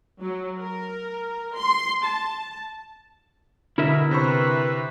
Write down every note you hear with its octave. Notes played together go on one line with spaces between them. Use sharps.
F#3
A#4
C6
A5
B2 D3 E4 A#4 E5
C3 B4 C5 C#6